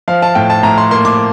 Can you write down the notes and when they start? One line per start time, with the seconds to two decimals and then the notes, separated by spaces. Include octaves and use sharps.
0.08 F3 F5
0.22 A5
0.35 A2 G5
0.50 A5
0.63 A2 A#5
0.78 C6
0.91 A#3 C6
1.05 D6